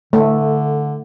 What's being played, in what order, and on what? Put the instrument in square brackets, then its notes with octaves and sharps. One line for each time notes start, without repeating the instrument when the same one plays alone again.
[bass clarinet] D3 [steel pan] A3